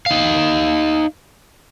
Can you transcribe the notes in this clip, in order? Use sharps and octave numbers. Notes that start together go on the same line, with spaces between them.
D#4 F5